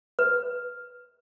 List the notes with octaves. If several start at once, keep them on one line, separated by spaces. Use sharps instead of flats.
B4